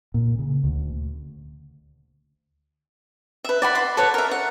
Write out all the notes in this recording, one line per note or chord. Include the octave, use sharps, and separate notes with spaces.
A#2
C#3
D2
B4 E5
D5 F#5 B5
B5 C6
A4 B4 C#5 F#5
A#4 E5
F#5